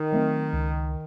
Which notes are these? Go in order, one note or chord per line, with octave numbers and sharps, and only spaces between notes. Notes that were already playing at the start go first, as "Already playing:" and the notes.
Already playing: D#3
F#3 A3 C4
C#2